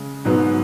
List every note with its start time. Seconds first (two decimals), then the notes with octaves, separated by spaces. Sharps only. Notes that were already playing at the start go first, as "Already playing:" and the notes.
Already playing: C#3 G#3
0.25 G#2 F#3 B3